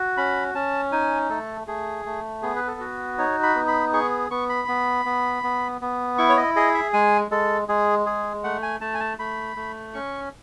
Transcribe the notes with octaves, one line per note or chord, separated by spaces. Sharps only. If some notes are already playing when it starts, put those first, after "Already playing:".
Already playing: F#4
C#4 B5
C#4 A5
D#4 G#5
A3 A4
A3 G#4
A3
B3 G#4
B4
A4
F#4
D#4 C#5
B5
B3
B5
G#4 C#6
B3 C#6
B5
B3
B3
B3
B3
E4 C#6
C#5
D#5
G#4 D#5
E5
G#3 G#5
G#3 A4
G#3 G#4
G#4
A3 F#5
G#5
A3 A5
G#5
A5
A3 B5
A3
C#4 C#6